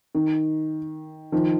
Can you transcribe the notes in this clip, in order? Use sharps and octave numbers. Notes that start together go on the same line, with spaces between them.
D#3
D#3 F3